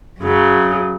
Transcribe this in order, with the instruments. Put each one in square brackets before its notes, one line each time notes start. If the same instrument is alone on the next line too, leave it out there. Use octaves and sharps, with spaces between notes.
[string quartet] F#2 C#3 F#3